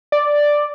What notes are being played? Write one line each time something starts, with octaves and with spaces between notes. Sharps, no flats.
D5